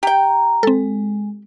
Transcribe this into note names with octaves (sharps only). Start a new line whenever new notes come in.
G4 G5 A#5
G#3 C4 A4